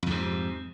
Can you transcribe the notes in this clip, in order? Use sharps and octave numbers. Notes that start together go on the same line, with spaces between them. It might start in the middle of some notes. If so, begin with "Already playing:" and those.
F2 G#2 C3